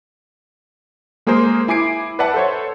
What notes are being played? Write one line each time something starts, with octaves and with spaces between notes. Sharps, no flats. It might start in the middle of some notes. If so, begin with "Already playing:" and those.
G#3 A#3 G#4 A#4 C5
E4 G#5 D6 C7 D7
B4 D5 E5 F#5 A5
A4 C5 C#5